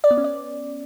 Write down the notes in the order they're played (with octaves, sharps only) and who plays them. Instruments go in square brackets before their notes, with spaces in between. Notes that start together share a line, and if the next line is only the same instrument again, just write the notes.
[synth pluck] D5
B3
C#4
D5